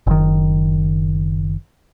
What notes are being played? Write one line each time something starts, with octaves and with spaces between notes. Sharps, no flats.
F#1 D#3